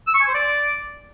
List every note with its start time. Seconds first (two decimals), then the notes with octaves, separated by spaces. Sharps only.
0.07 E6
0.14 C#6
0.21 G#5
0.28 C5
0.34 D5